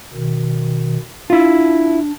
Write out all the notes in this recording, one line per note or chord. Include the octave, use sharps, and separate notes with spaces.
B2 D#3
D4 E4 F4